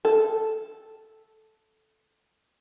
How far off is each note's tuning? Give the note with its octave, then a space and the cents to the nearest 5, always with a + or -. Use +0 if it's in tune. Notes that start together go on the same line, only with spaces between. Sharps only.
A4 -10